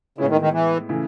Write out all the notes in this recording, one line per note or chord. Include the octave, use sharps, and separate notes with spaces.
A2 C#3 G#3 B3 E4
D#3
D#3
E3
C#3 E3 A3 E4